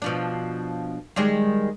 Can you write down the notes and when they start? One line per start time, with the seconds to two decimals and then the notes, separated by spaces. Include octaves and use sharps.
0.02 B2 F3 D4
1.16 D#3 G3 G#3